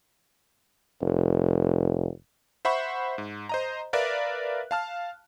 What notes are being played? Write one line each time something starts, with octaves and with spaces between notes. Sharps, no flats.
F1
C5 E5 F#5 B5 C#6
G#2
C5 D#5 A#5
A#4 B4 D5 E5 F5 F#6
F5 A5 F6